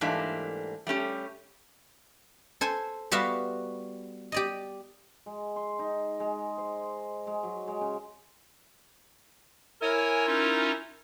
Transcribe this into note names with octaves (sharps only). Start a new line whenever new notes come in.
G#2 E3 G3 A3 A#3 D4
G3 A3 C#4 G4
A4 C5 G#5 C6
G3 B3 F#4 E5 F5 C6
G4 D5 D#5
G#3
C6
D#4
G#3
C5
G#3
F#3
G#3
C#3
E4 A#4 C#5 G#5
C#4 D#4 F4